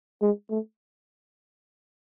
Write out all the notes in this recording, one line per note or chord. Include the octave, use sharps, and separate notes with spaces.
G#3
A3